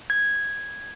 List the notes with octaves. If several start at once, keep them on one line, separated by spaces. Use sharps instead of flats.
G#6